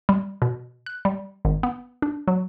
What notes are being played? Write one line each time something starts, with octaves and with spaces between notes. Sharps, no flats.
G3
B2
F#6
G3
G#1
B3
D4
F#3